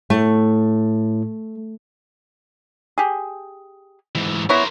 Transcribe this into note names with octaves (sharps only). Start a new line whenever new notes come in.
A2 A3
G4 G#4
G#2 E3
B3 E4 A#4 C5 C#5